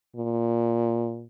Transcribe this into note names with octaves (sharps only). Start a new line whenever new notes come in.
A#2